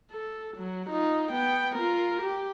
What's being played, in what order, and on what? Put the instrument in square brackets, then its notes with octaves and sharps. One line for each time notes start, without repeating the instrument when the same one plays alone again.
[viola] A4
F#3
D#4 F4
B3 G5
F4 A#4
G4